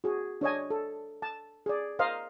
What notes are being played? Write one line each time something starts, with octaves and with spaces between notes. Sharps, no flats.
F#4 G#4
D4 C#5 D#5 G#5
A4
A5
G#4 D5
A#4 C5 D#5 F5